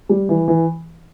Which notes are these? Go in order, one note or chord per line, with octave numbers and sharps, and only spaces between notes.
G3
E3
E3